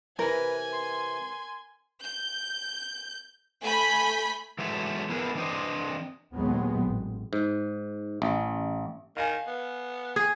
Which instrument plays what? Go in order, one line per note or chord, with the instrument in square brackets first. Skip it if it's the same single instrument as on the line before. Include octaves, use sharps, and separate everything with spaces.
[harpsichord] C3 E3 [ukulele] A#4 [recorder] B4 [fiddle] G#5
[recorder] C6
[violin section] G6
A3 G#5 B5 G6 B6
[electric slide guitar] E3 F#3 G#3 A3 E5
B3 E4 G#4 A#4 B4
E3 C4 D4 C5 D#5
[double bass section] D#2 A#2 F#3 G#3 B3 C4
A1
[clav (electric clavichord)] G#2
A1
[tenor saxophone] D#3 [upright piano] F5 G#5
[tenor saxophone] B3
[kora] G#4